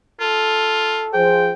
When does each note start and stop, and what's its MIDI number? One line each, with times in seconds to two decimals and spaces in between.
0.20 1.05 65
0.20 1.15 69
1.13 1.51 53
1.13 1.51 68
1.13 1.51 72
1.13 1.53 79